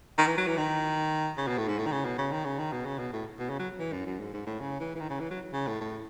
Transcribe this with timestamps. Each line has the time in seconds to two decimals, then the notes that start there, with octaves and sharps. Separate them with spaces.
0.18 D#3
0.27 E3
0.38 F#3
0.47 E3
0.58 D#3
1.38 C#3
1.48 B2
1.58 A2
1.68 G#2
1.79 A2
1.86 D#3
1.92 C#3
2.05 B2
2.18 C#3
2.32 D#3
2.45 C#3
2.59 D#3
2.72 B2
2.86 C#3
2.99 B2
3.13 A2
3.39 B2
3.50 C#3
3.59 F#3
3.79 E3
3.93 F#2
4.06 F#2
4.20 G#2
4.33 G#2
4.46 A2
4.61 C#3
4.80 E3
4.96 E3
5.00 D#3
5.10 C#3
5.20 E3
5.31 F#3
5.53 C#3
5.67 A2
5.81 A2